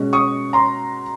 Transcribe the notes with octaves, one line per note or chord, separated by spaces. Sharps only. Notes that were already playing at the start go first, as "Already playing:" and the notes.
Already playing: B2 G#3 C#4 F#4
C#6 D#6
A#5 C6